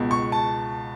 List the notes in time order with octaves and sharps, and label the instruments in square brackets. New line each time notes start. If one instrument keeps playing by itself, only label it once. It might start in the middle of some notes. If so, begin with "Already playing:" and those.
Already playing: [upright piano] C#2 B2
C#6
A5